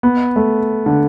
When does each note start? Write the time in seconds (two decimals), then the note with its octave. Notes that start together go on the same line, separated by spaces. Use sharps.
0.03 B3
0.36 A3
0.86 D3